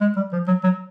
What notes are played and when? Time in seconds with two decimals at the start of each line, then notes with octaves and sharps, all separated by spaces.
0.01 G#3
0.17 G3
0.33 F3
0.48 F#3
0.64 F#3